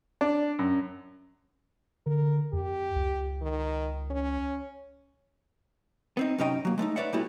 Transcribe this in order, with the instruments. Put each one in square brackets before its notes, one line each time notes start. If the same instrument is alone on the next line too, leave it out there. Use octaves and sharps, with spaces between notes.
[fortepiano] D4
F#2
[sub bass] D3 [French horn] A#4
[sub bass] F2 [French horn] G4
[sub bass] C#2
[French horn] D#3
C#4
[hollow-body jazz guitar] B3 C4 D#4
F#2 C3 C#4 D#4 D#5 G5
F#3 A#3
G#3 A3 C#4 D#4
B4 C#5 D5 E5 F#5
A#2 G3 A3 B3 E4 F#4